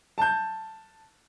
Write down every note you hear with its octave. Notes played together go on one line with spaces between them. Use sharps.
A5 G6